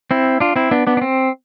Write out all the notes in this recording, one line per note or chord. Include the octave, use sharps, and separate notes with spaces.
C4 E4
D4 F4
C4 E4
B3 D4
B3 D4
D4
C4